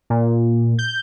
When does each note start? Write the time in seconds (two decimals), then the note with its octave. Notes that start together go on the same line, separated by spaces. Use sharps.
0.10 A#2
0.79 G6